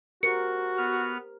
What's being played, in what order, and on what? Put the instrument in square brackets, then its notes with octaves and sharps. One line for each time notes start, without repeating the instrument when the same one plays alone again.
[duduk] F#4 [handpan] G4 A#4 C5 [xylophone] C#7
[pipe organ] B3 F6